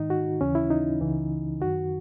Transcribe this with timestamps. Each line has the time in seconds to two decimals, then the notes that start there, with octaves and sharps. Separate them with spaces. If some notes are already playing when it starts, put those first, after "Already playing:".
Already playing: G#2 D#3 D#4
0.10 F#4
0.41 D#2 C#3 E3 C#4
0.55 E4
0.71 D#4
1.01 C#2 C#3 E3
1.61 F#2 D#3 F#4